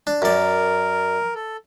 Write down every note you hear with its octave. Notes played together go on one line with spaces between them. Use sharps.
D4
F#2 A#4 D5
A4